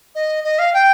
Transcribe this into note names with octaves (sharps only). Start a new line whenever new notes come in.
D#5
D#5
F5
G5